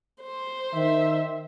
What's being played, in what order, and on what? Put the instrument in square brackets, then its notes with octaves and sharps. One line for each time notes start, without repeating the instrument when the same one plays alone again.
[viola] C5
[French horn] D#3 [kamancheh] E5